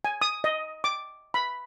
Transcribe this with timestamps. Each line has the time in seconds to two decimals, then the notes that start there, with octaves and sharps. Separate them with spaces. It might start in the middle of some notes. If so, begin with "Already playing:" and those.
0.05 G#5
0.22 D#6
0.44 D#5
0.84 D6
1.34 B5